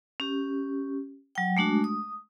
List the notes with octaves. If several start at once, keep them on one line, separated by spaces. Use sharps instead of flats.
C#4 G4
F#3 G5
G#3 A3 D4 F#4
D#6